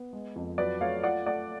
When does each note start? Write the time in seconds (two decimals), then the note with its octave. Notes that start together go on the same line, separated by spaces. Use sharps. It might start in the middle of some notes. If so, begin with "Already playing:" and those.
Already playing: B3
0.13 G#3
0.36 F2
0.58 F#3 B4 D5
0.81 A3 C#5 F5
1.03 F4 D5 F#5
1.26 A3 D5 F#5